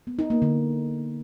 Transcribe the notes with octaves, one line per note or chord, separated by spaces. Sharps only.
B3
D#4
A#3
D3